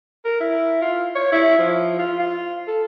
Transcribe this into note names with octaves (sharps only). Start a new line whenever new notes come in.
A#4
E4
F4
C#5
E4
F3
F4
F4
A4